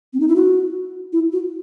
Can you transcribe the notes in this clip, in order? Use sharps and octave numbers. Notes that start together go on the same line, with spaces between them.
C4
D#4
E4
F#4
E4
F#4